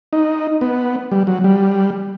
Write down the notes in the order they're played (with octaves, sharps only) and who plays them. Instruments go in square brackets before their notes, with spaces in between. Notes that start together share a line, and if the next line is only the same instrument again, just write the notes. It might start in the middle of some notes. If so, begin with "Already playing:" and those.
[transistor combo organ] D#4
B3
G3
F#3
G3